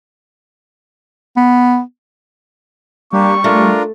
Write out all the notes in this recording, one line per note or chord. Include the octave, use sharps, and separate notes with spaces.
B3
G3 A#3 D4 G4 C#6
A3 D4 F4 A#4